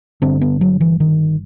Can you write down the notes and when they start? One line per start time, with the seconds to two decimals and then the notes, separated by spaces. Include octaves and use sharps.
0.22 G1 G2 D3 C4
0.41 B3
0.61 F#3
0.81 E3
1.00 D#3